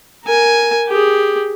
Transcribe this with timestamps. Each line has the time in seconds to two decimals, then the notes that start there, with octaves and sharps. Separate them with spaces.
0.25 A#4 G#5
0.88 G4 G#4